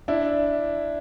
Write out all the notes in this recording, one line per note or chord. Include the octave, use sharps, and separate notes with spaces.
D4 E4